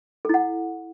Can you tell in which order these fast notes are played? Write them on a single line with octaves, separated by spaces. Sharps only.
A4 E4 F#5